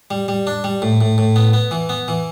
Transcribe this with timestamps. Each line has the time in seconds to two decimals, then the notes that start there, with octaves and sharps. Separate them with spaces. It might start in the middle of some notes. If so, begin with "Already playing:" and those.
0.11 G3
0.28 G3
0.47 D4
0.64 G3
0.82 A2
1.01 A2
1.18 A2
1.36 B3
1.53 B3
1.71 E3
1.89 B3
2.08 E3